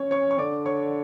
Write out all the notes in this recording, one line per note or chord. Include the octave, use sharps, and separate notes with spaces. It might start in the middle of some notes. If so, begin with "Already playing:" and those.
Already playing: C#4 C#5 C#6
C#5 C#6
C#6
D3 D5 D6
C#5 C#6